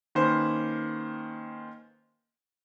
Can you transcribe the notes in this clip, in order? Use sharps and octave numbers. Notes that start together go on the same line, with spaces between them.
D#3 A#3 C#4 B4 C5